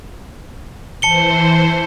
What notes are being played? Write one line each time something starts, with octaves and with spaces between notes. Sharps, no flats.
E3 C5 A5 C#7 G7